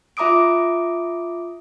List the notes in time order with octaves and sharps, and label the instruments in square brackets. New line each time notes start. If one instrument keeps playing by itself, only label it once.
[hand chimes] F4 E5 A#5 D6 D#6 D7